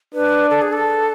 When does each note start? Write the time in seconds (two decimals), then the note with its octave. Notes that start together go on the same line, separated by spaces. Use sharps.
0.14 D4 B4
0.50 A4
0.62 G#4
0.73 A4